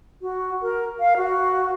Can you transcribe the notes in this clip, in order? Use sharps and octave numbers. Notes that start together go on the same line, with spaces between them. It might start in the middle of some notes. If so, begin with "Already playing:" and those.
F#4
A#4
F5
F#4